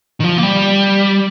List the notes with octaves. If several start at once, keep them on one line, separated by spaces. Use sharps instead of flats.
D#3
F3
A#3
G3